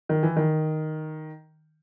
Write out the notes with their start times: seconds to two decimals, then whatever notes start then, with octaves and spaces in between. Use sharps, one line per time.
0.09 D#3
0.23 E3
0.36 D#3